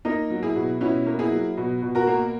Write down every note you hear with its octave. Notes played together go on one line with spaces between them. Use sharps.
A#3 D#4
F#3
E4 G#4
B2
B2 C#4 E4
A#3
E4 G#4
F#3
B2
B2
F#4 A#4
A#3